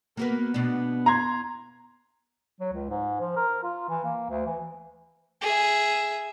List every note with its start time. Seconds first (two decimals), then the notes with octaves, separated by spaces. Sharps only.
0.17 A#3 B3 F#4 B4
0.54 B2 D4
1.06 A#5 C6 G#6
2.61 F#3
2.73 C#2
2.90 G#2
3.21 F3
3.36 A#4
3.64 F4
3.89 E3
4.04 A#3
4.30 D2
4.46 E3
5.41 G#4 E5